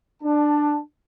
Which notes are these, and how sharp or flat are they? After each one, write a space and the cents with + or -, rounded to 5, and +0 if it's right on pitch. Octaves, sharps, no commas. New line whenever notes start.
D4 +15 A5 +0